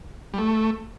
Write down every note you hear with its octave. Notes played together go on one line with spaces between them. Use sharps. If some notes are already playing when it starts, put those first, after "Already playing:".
G3
A3